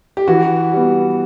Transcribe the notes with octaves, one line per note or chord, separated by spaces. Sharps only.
G4
E3 F#4
G3 B3